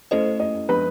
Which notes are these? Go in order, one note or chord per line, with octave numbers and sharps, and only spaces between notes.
A3 C#4 E4 A4 C5 D#5
D#5
F3 G#3 B3 D4 B4